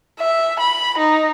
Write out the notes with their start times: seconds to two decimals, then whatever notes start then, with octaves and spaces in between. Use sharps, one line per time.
0.20 E5
0.60 B5
0.98 D#4